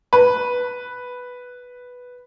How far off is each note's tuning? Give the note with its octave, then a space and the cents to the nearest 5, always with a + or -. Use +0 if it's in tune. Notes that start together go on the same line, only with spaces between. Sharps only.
B4 +0